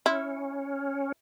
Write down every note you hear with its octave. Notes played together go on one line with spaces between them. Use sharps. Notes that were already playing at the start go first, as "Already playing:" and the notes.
C#4 E4